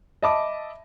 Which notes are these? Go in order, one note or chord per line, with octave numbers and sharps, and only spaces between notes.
D#5 E5 A5 B5 D6